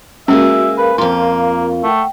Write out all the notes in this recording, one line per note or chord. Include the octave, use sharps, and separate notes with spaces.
G#3 A#3 C#4 F#4 G#4 E5
A#4 B4 F5
F2 A#3 F4 C6
A3 F#5 G5